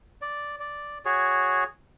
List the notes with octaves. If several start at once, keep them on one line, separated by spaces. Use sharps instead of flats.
D5
D5
F#4 G#4 C#5